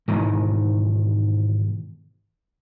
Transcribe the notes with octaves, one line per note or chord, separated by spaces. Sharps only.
G#2 B2 D#3 E3